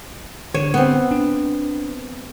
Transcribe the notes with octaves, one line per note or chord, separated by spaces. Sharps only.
D3 C#5
B3 C4
D4